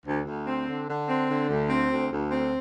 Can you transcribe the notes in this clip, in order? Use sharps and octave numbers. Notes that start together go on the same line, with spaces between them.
D2
D2
C4
D3
D3
C4
D3
D2
C4
D2
D2
C4